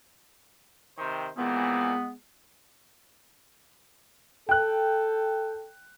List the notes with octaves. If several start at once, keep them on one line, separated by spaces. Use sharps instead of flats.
C3 D#3 C5
A#2 E3 G#3 B3 C4
A4 G5 F#6